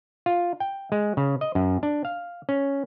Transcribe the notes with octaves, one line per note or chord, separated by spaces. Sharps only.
F4
G5
G#3
C#3
D#5
F#2
D4
F5
C#4